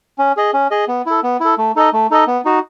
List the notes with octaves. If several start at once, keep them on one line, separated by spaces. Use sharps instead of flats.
C#4
G#4 D#5
C#4
G#4 D#5
B3
E4 A4
B3
E4 A4
A3
D#4 A4 D#5
A3
D#4 A4 D#5
B3
D#4 F#4